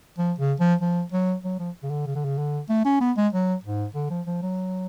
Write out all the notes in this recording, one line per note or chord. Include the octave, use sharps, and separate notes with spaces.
F3
C#3
F3
F3
F#3
F#3
F3
C#3
D3
C#3
D3
C#3
D3
A3
C#4
B3
G#3
F#3
G#2
D3
F3
F3
F#3